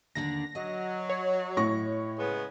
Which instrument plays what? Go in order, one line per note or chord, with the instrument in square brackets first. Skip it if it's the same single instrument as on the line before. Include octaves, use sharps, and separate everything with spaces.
[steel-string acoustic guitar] D#2 D3 D4 [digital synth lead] A#6
[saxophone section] F#3 [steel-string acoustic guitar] D#5
[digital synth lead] C#5
[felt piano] A2 C#6 A#6
[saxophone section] C#3 G#3 B3